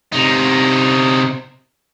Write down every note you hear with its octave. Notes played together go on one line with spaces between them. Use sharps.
C3 D#4